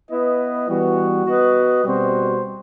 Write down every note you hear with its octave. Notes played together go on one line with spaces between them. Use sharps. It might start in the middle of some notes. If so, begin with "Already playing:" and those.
B3 E4 B4 D#5
E3 G3 B3 F#4
B3 F#4 B4 D#5
B2 G3 C4 F#4 C5